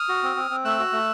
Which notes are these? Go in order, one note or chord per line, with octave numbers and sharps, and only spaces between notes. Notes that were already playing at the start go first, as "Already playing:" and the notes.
Already playing: D#6 F6
F#4
C4
C4
C4
A3 E6 F#6
F#4
A3